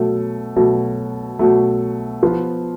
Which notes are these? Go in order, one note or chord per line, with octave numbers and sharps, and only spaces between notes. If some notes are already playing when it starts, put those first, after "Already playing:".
Already playing: B2 F#3 A3
B2 F#3 A3
B2 F#3 A3
F3 B3 F4